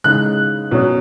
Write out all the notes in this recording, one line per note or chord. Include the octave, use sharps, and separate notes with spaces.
C#3 G#3 D#4 F#6
B2 F#3 C#4